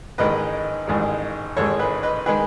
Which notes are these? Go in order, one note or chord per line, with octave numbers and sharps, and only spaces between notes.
A1 G#2 D#3 G#3 B4 D#5
A1 G#2 D#3 G#3
A1 G#2 D#3 G#3 A4 C#5
G#4 B4
B4 D#5
D#3 G#3 G#4 B4